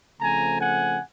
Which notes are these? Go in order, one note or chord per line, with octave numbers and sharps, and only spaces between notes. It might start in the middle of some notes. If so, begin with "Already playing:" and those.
C#3 F3 A3 C4 G#5 A#5
F#5 G#5